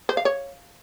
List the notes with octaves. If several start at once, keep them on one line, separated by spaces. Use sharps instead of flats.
C5
F5
C#5